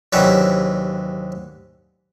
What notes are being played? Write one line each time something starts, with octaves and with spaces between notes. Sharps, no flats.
D#2 C3 E3 F#3 C#4 D4